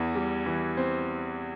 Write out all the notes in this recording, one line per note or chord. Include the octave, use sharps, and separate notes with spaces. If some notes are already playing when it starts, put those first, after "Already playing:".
Already playing: E2 E3
G3
E3
C4